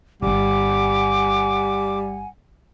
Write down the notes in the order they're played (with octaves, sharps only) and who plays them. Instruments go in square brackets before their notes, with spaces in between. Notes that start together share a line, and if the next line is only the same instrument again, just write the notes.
[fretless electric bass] D1 G1 [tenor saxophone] G3 [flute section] F#5 G#5 [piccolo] D6